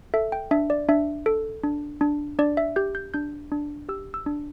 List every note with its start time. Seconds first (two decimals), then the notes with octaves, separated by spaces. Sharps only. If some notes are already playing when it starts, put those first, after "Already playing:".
0.14 A4 E5
0.32 G5
0.51 D4 E5
0.70 D5
0.89 D4 E5
1.26 A4
1.64 D4
2.01 D4
2.39 D4 D5
2.57 E5
2.76 G4 G6
2.95 G6
3.14 D4 G6
3.52 D4
3.89 G4 E6
4.14 E6
4.26 D4